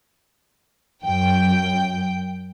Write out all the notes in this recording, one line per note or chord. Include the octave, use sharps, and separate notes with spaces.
F#2 G5